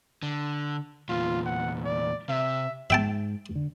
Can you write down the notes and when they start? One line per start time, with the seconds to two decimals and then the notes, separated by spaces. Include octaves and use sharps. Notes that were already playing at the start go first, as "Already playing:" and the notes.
0.23 D3
1.09 E2 A#2 F4
1.46 F#5
1.85 D5
2.29 C3 E5
2.90 G#2 E5 G5 A5
3.55 D3